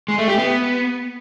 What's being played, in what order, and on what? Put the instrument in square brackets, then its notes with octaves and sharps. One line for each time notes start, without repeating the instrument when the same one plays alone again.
[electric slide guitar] G#3
A3
G4
B3